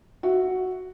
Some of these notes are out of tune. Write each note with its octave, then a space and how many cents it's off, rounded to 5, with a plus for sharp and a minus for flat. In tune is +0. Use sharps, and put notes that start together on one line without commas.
F#4 +0 E5 +0